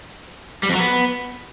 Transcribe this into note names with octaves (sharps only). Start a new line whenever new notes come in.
G3
F2
F#3
B3